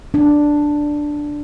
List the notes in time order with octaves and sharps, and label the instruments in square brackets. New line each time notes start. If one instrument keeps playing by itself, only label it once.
[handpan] D4